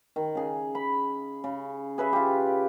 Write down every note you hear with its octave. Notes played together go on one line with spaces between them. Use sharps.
D#3
C#3 G#4
B5
C#3
G#4 B4 C#5 E5
F4 G4